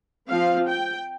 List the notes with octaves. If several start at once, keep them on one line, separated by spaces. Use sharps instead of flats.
F3 C4 F5
G5